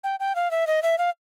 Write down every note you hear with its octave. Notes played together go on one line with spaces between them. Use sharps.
G5
G5
F5
E5
D#5
E5
F5